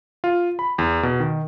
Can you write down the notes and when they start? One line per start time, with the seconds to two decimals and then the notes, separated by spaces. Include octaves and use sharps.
0.24 F4
0.59 B5
0.78 E2
1.03 B2
1.20 D#3